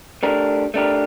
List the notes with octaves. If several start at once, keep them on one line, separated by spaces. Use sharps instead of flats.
A3 D4 G4 A#4
A3 D4 G4 A#4